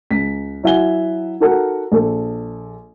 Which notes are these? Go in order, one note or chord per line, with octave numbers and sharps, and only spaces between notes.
C#2 B6
F#3 E4 E5 F#5 G#5 G7
D#4 F#4 A4 A#4 F#5
A#1 A4